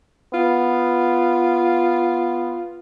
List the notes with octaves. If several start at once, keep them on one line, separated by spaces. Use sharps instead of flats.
B3 F4